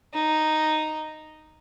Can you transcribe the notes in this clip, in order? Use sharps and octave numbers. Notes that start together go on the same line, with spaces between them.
D#4